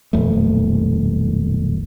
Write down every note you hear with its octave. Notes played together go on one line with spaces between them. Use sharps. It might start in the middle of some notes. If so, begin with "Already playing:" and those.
D#1 B1 F2 A3